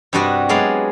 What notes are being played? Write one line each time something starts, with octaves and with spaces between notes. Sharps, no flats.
G2 C3 G3 D4 F#4 D#5
F#3 G#3 B3 D5 F5